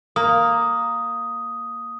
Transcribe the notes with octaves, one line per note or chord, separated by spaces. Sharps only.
A#3 D#6